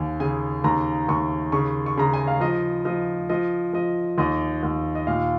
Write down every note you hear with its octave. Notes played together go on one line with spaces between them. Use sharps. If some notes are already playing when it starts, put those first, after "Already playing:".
Already playing: D#2 G#5
C#3 G#5
D#2 A#5
D#2 C#6
C#3 C#6
C#6
C#3 A#5
G#5
F5
F3 D#5
F3 D#5
F3 D#5
F3 D#5
D#2 D#5
D#2
D#5
A#2 F5